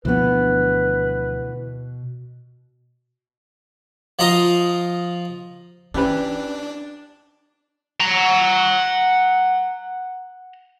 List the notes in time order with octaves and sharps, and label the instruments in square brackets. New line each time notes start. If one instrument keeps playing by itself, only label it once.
[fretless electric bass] D2 F3 D4 [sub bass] B2 [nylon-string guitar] E3 B3 [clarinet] B4
[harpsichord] F3 F4 D#5 A#5 C6
[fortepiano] E3 G4 B4 [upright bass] C#4 [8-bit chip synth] D4
[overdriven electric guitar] F#5 A#5